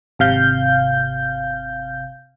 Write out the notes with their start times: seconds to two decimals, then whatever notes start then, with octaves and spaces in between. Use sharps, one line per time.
0.19 G#1 C3 F5 G6